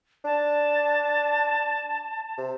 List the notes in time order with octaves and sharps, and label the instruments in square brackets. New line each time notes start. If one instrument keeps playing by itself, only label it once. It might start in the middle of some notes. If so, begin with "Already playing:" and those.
[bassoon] D4 [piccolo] A5
[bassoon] C3